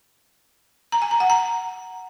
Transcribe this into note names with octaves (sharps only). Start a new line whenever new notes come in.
A#5
G#5
A#5
F#5
A#5